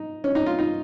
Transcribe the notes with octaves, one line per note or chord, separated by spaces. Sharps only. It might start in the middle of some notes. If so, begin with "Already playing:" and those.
Already playing: D#4
C#4
D#4
F4
D#4